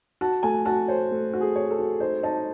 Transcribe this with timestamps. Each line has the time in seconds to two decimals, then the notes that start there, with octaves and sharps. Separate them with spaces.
0.21 F#4 A5
0.43 A3 G#5
0.65 F#4 A5
0.88 C5 C#5
1.11 A3
1.33 F#4
1.41 G#4
1.56 C#5
1.70 A4
1.79 F#4
2.00 D#4 C5
2.23 D#4 A5